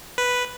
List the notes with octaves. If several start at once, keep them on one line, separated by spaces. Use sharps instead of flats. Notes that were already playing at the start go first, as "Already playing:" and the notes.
B4